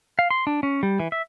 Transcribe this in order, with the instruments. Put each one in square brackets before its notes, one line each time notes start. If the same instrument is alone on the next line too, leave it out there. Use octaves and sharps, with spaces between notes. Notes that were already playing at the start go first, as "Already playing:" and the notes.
[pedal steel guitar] F5
C6
D4
C#4
G3
E3
E5